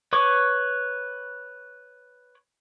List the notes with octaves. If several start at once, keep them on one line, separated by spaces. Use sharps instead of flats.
B4 C#5 C#6 D6